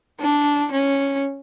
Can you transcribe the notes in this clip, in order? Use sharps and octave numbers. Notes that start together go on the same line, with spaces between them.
D4
C#4